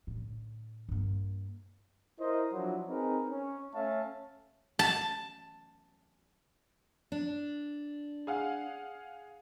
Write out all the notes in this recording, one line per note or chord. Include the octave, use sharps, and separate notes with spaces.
A2 D3
G2 A#3
E4 A#4 C5 D#5
F3 F#3 D4 E4 F4
C4 D#4 G#4 A#4 B4
C#4
A3 C#4 E5 F5 A5
A5
D4
G#4 F5 F#5